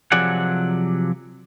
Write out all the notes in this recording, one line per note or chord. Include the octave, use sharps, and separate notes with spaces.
C3 F3 F#3 G#4 D5 F#5